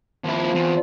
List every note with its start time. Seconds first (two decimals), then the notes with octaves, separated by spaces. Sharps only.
0.24 D#2 F3 C4 E4
0.54 E2